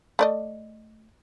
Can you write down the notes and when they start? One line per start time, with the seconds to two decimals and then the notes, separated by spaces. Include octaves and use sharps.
0.19 A3 D5 D#5